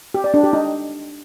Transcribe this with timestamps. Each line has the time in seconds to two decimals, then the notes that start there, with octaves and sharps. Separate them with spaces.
0.14 G4
0.24 D5
0.34 D4
0.43 G4
0.53 D#4